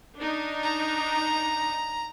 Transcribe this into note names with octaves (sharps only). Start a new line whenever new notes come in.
D4 D#4
A#5